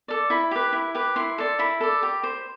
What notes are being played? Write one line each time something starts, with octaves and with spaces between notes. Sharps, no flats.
A4 D5
E4 B5
G4 B4
E4
G4 B4
E4 C6
A4 D5
E4 B5
A4 D5
G4
C5